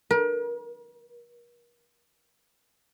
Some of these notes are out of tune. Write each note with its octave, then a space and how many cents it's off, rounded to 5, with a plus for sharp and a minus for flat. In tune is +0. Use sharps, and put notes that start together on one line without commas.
A#4 +40